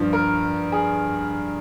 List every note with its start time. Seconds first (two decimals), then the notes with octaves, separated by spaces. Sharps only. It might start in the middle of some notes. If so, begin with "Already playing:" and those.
Already playing: G2 F3
0.13 A#4
0.72 G#4